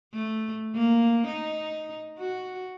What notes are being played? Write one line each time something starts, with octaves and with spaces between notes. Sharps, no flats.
A3
A#3
D#4
F#4